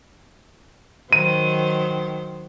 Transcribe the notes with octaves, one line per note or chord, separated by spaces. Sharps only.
D#3 F#3 C5 D#7